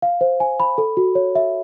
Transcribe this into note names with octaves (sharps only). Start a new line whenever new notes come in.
F5
C5
G#5
B5
A4
F#4
C#5
E5